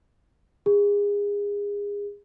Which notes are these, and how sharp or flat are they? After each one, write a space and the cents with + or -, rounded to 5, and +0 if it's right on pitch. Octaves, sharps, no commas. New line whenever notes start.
G#4 -30